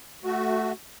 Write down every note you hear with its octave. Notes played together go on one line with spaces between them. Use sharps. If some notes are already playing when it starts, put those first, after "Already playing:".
A3 F#4